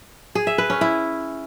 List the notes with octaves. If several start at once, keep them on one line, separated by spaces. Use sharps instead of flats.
G#4
E5
B4
C#4
E4